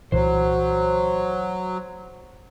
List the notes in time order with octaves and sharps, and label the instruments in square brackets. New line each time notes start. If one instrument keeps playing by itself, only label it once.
[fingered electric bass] C2 A#2 E3 [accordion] F#3 [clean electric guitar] C5